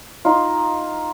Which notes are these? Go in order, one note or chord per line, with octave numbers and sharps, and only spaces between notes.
D#4 F4